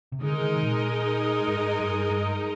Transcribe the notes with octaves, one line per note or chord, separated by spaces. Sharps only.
C3
D3 G#3 D#4 A#4 D#5
D#3
C3
A#2
G#2
G2
G2